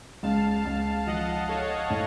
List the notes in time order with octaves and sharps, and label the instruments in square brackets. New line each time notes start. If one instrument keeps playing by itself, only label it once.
[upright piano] C#2 [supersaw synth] F5 A5
[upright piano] C#2
[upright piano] F3 [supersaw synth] D#5 F#5
[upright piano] A4 [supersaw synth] C#5 F5
[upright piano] A2